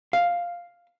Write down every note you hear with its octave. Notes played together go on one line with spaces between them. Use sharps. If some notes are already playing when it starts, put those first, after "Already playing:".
F5